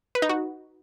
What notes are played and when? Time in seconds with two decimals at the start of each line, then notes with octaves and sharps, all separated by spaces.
0.15 B4
0.22 D#4
0.29 F#4